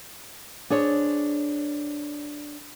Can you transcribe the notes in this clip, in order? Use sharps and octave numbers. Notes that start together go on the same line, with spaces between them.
D4 G#4 C5 C#5